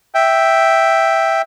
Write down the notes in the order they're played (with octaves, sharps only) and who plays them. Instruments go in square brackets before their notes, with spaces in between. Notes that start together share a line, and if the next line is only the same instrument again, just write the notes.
[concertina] E5 G5